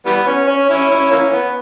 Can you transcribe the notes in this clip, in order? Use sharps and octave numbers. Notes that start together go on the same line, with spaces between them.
E3 G3 B3
C#4
C#4
C#4 E4
C#4 E4
E3 A#3 C#4
B3